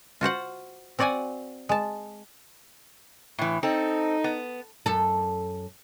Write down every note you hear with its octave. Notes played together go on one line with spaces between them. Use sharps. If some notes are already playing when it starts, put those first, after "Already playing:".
F4 F#4 C5 F#5
C4 F#4 D5 F#5 G#5
G#3 A5
A2 E3
C4 D#4 A4
B3
F#2 A4